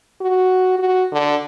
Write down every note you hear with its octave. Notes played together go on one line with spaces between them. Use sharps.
F#4
F#4
D3